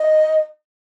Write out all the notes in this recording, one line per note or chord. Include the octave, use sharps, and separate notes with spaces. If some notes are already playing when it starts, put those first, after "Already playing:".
Already playing: D#5